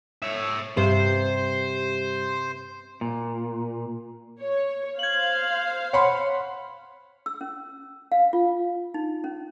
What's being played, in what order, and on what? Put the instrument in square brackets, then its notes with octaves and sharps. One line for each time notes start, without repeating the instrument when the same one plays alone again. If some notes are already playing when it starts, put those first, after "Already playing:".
[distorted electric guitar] C#5 E5
[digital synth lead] G2 [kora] C3 [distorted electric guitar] C5
[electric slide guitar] A#2
[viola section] C#5
[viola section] C5 F5 [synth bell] G#6 F#7
[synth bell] C#5 [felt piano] F#5 B5 C6
[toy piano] E6
C#4
F5
F4
D#4
C#4